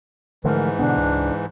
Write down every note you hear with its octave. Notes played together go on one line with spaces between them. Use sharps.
G#2 D3 E3 F3 A3 A#4
B2 D3 B3 D4
C#2